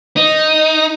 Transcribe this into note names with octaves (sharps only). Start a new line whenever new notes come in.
D#4